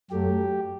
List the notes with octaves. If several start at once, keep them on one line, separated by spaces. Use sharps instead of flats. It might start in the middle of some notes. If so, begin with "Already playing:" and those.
F#2 F#3 A3 G4